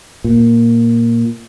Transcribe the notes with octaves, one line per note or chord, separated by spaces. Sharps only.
A#2